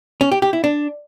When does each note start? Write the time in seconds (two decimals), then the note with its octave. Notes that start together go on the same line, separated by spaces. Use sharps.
0.21 C#4
0.32 G4
0.42 G4
0.53 E4
0.64 D4